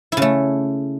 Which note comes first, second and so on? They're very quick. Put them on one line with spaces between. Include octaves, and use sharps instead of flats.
E4 C#3 A3